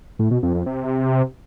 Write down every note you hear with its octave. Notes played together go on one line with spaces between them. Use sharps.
A2
B2
F2
F2
C3